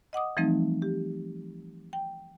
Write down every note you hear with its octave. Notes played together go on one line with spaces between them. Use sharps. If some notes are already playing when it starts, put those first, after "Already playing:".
D#5 F#5 D6 D#6
E3 F3 G3 A3 C4 D#4
G4
G5